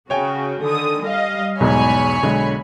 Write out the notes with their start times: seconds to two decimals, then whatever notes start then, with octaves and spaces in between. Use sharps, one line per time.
0.10 C#3 F#4 C#5 G5 G#5
0.63 D3 D#3 D#6
1.03 G3 D#5 F5
1.60 B1 E2 G#2 C#5 G#5 B5
2.23 B1 D3 G#3